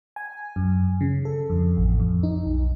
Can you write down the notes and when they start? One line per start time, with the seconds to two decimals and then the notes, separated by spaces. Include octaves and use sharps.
0.16 G#5
0.56 F#2
1.01 C#3
1.25 A4
1.49 F2
1.77 A1
2.00 F2
2.23 D#4
2.45 B1